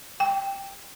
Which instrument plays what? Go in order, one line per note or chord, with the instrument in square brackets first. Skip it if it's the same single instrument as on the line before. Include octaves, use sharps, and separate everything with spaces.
[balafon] G5